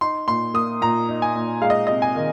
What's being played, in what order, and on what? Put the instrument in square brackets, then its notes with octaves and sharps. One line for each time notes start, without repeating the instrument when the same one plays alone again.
[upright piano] D#4 C6
A#2 C6
A#3 D#6
A#2 A#5
D#4
G#5
A#2
G#3 F5
D#5
C3 D#5
G#5
D#3